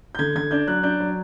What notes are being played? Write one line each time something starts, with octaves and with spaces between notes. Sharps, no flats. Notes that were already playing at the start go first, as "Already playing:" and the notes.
G6
D3 G#6
D3 G#6
D4 G6
F#3 F#6
D4 G6
F#3